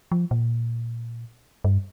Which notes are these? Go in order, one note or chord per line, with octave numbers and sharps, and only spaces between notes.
F3
A#2
G2